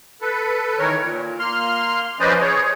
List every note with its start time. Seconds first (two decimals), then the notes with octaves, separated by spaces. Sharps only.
0.22 A4 B4
0.78 D#3 E3 A#4 C#5
1.00 A#2
1.39 A#3 C6 F6
2.20 F3 C#4 B4 C5 D5 D#5
2.41 G#4 C#5